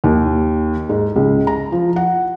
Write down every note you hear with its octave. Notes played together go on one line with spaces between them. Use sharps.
D#2
G#2
C#2
A#5
F3
F#5